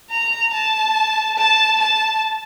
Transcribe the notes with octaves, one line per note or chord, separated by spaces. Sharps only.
A#5
A5
A5
A5